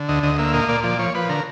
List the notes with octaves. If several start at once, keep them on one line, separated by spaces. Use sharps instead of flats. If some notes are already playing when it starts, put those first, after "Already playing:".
Already playing: D3
D2 D#5
D2 D#5
A#3 E5
A#2 D#5
A#2 D5
F3 D5
F3 C#5
F3 B4
D3 A#4